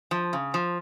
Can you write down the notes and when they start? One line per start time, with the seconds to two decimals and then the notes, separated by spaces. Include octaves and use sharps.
0.11 F3
0.33 C#3
0.54 F3